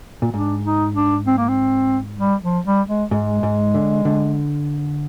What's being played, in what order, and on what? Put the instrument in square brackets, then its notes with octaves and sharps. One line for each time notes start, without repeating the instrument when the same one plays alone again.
[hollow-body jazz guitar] A#2
[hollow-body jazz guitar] G#2 [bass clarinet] D4
[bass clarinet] D#4
D4
C4
A#3
C4
G3
F3
G3
G#3
[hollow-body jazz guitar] G#2 [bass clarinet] G#3
[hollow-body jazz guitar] G#2
D3
D3